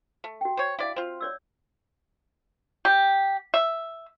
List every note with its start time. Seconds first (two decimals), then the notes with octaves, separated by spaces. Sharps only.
0.24 A3
0.41 F#4 G5
0.57 C5 C#5
0.79 E4 D5 E5 F5
0.96 C4 F4
1.21 C#5 D5 E6
2.85 G4
3.54 E5